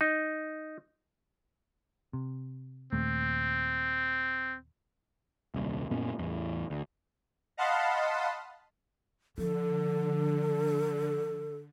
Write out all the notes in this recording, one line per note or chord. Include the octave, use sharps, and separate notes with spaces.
D#4
C3
D#2 A#2 A3 C4
D#1 C2
F#2 A#2 B3 C#4
A1 E2
D2
D#5 F5 F#5 A5 B5 C6
D3 F3 A4